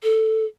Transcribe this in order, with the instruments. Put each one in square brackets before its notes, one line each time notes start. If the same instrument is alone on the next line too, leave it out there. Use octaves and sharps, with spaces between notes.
[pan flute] A4